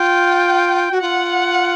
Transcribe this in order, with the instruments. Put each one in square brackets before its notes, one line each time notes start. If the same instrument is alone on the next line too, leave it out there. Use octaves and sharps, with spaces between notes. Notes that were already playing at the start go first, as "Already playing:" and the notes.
Already playing: [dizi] F4 [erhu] G5
[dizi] F#4
[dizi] F4 [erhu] F#5